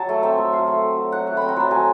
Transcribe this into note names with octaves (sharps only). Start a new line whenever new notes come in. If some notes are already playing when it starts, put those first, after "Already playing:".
Already playing: F#3 A5
A3
C4 E5
F#3
F#3 F5
A3
C4
F#3
F#3 F#5
A3
C4 B5
A#5
F#3 A5
F#3 G#5